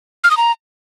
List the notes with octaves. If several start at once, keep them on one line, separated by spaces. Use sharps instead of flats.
F6
D#6
A#5